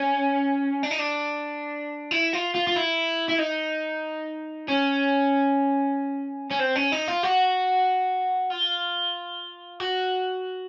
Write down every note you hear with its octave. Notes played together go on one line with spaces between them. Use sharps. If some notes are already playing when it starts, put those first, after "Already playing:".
Already playing: C#4
D4
D#4
D4
E4
F4
F4
F4
E4
E4
D#4
C#4
C#4
C4
C#4
D#4
F4
F#4
F4
F#4